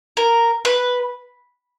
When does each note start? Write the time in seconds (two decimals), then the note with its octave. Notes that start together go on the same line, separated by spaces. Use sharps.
0.17 A#4
0.65 B4